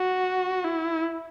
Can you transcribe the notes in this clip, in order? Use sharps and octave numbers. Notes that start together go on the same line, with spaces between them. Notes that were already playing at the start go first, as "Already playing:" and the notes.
Already playing: F#4
E4